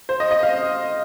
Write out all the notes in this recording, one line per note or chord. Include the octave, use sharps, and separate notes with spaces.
C5
D#5
D#5
F5